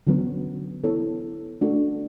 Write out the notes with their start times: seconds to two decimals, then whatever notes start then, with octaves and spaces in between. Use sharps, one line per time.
0.07 D3 F#3 B3
0.84 B3 E4 A4 C#5
1.61 A3 D4 F#4 A4